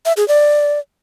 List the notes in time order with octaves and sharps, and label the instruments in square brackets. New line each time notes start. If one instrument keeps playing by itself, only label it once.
[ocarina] E5
G#4
D5